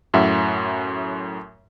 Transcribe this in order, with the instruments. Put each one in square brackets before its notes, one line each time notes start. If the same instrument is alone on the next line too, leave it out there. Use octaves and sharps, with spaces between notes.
[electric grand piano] F#2 A2 E5 F#5